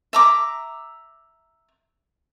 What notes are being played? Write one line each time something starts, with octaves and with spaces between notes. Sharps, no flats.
E5 A#5 D6